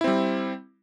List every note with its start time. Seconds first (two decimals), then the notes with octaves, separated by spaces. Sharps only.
0.01 E4
0.04 C4
0.07 G3